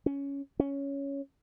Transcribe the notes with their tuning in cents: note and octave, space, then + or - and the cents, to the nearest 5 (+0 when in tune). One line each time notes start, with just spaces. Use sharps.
C#4 +10
C#4 +5